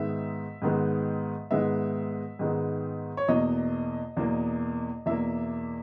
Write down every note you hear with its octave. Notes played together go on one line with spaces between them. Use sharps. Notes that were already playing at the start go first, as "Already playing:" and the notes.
Already playing: G#2 D#3 G#3 B3 E5
G#2 D#3 G#3 B3
G#2 D#3 G#3 B3 E5
G#2 D#3 G#3 B3
C#5
E2 B2 A#3 D#5
E2 B2 A#3
E2 B2 A#3 E5